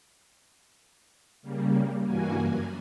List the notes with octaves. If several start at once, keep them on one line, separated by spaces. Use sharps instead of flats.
C#3 G3 A#3
G2 E3 A#3 F#4 G#5
F#2